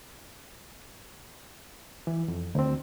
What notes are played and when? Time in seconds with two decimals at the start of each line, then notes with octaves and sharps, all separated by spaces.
2.07 E3
2.28 F2
2.55 D2 C4